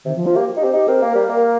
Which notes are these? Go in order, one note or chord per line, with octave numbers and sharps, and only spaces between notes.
C3 D#3
F3
F3 F4
A#3 G4
D#4
C4 G4
D#4 G4
C4 A#4
A#3
G3
A#3